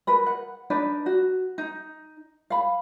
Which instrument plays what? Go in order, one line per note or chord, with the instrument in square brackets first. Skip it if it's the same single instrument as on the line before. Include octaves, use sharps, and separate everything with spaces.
[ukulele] A#4 B4 B5
F#5
D4 D#4 B4 D5
F#4
D#4
F5 B5